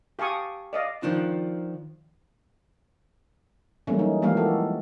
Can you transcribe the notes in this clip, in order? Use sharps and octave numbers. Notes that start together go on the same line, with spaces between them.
G4 F5 G#5 A5 C#6 D#6
D5 D#5 F5
D#3 F3 D4 F4
E3 F#3 G3 A3 A#3 C#4
D#4
E3 F3 G#3 A#3 G4 F5
F#4 A4